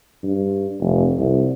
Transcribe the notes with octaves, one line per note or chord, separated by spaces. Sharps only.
G2
F1
C2